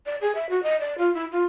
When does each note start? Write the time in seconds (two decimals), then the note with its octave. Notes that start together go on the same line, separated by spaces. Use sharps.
0.06 D5
0.21 G#4
0.35 E5
0.50 F#4
0.63 D#5
0.80 D5
0.98 F4
1.14 E4
1.32 F4